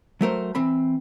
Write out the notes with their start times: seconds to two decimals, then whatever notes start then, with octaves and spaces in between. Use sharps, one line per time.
0.21 F#3 A3 A#4 C5
0.55 E3 C4 B5